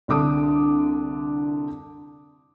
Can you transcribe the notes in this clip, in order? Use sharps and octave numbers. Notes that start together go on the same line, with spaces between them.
C2 D3 D4 D6 D#6